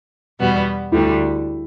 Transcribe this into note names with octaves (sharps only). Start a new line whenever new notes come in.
E2 B2 G3 B3 F#4
D2 D3 G3 E4